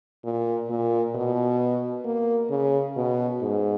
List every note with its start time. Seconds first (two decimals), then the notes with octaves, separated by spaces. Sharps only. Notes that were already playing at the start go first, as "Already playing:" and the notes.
0.24 A#2
0.70 A#2
1.15 B2
2.05 A#3
2.50 C#3
2.96 B2
3.42 G#2